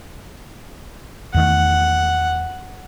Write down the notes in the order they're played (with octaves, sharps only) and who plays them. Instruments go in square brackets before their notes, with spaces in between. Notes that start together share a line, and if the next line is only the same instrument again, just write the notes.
[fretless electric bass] E2 D#3 A3 [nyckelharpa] F#5